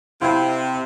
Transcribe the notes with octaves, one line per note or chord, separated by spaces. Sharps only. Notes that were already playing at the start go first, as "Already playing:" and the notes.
C3 E4 F4